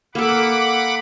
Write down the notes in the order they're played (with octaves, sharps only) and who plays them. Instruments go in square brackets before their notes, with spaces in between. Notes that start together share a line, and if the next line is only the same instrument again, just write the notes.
[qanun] A#3 A4 [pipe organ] F#5 B5 D6